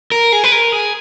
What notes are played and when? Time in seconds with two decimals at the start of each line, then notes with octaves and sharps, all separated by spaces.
0.12 A#4
0.32 G#4
0.44 B4
0.52 A#4
0.72 G#4